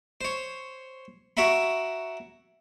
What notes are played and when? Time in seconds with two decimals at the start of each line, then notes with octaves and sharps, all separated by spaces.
0.21 C5 C#5
1.37 F#4 A#4 C#5 E5 F#5 B5